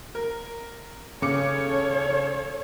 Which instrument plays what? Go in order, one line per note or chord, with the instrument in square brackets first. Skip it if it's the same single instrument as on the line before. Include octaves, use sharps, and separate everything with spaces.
[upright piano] A#4
[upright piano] C#3 D6 C#7 [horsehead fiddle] A4 C#5